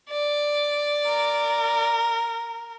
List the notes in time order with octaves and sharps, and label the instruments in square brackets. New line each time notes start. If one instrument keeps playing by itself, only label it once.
[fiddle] D5
[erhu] A#4